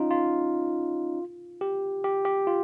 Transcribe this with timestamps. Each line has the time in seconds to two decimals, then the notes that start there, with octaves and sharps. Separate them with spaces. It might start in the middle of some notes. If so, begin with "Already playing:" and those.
Already playing: C#4 D#4 F4
0.11 F4
1.61 G4
2.04 G4
2.25 G4
2.47 F4